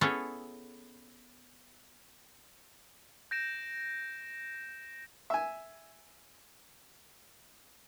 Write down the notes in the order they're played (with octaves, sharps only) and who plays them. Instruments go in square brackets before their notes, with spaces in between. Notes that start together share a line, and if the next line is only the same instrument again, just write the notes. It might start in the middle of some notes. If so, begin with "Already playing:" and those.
[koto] B3 C#4 E4 G#4 A4 C#5
[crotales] G6 A#6 D7 E7
[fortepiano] E5 G#5